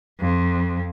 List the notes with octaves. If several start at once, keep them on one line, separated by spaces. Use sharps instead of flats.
F2